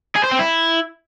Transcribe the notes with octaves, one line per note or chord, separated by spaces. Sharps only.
G#4
C5
C4
E4